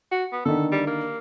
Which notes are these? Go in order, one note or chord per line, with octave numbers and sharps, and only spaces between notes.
F#4
B3
D3 D#3 A4
G3
A#3